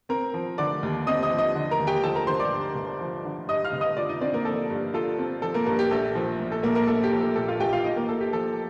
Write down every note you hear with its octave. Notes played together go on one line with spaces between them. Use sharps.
C4 A#4 A#5
F3
D3 D5 D6
D#2
C4 D#5 D#6
D#5 D#6
F3
D#5 D#6
D3
A#4 A#5
D#2
G4 G5
F3 A4 A5
A#4 A#5
D3 C5 C6
D5 D6
G2
G1
F3
D3
G2 D#5 D#6
F5 F6
G1
D#5 D#6
F4 D5 D6
D#4 D#5
C4 D4 D5
A#3 A#4
F3 A4
G2
F4 A4
C4
F3 A4
A#3 A#4
G2 A#3 A#4
G4
A#1 A4
F3
A#2
A4
A#1 A#3 A#4
A#3 A#4
A#1 A4
G4
F3
A4
A#2 A4
F4 F5
A#1 G4 G5
F4 F5
D#4 F4 D#5
A#3 A#4
A#3 A4
G4
F3 A4